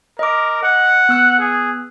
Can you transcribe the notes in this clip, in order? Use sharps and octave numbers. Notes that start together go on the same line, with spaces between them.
A#4 D#5 D6
D#5 F#5
B3 E6 F#6
G#4